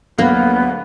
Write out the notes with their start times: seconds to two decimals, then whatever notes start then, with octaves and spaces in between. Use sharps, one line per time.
0.19 D2 F#3 A#3 B3 D4